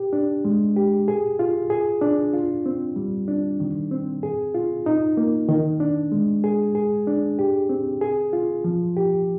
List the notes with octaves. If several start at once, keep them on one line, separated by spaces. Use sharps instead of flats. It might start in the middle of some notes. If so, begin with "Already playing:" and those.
Already playing: G4
D4
G#3
G4
G#4
F4
G#4
D4
F4
C4
G3
D4
D#3
C4
G#4
F4
D#4
A#3
D#3
D4
G#3
G#4
G#4
D4
G4
C4
G#4
F4
F3
G4